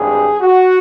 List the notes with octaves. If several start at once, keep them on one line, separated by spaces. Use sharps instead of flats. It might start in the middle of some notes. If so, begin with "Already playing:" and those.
Already playing: G#1 G2 G#4
F#4